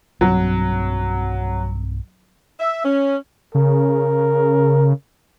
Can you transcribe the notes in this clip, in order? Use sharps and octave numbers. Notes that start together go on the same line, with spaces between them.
B1 G2 F#3 C4
E5
C#4
C#3 A#4